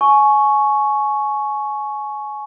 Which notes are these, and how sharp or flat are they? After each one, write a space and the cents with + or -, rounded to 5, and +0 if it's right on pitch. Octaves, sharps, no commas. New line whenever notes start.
G#5 +25 C#6 +0